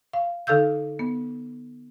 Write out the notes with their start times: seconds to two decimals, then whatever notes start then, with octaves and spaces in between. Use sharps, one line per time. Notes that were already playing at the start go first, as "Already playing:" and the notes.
0.13 F5
0.47 D3 D#4 A4 F5 E6 G6
0.99 B3